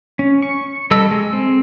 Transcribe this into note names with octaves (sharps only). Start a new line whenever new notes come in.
C#4
C#6
G3 A4 D#5 E6
G#3
C4